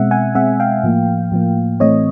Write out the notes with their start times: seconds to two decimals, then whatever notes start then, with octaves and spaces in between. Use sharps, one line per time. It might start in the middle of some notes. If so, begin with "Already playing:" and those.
Already playing: B2 G#3 C4 E5 F#5
0.11 F#5 G#5
0.35 B2 G#3 C4 E5 F#5
0.60 F5 G5
0.83 A2 F3 A#3
1.32 A2 F3 A#3
1.80 A2 E3 A3 C4 C#5 D#5